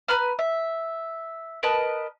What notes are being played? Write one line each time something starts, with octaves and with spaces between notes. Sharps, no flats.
B4 A#5 B5 F6
E5
A#4 B4 D#5 A5